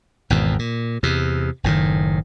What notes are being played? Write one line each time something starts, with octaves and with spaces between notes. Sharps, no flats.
G#1 E2 B2
A#2
E2 C3
F#1 A2 D#3